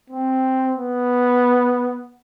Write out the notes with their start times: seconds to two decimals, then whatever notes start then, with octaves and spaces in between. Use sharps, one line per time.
0.10 C4
0.77 B3